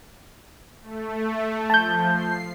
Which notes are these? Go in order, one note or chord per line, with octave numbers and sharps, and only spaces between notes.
A3
F3 A5 G6
C7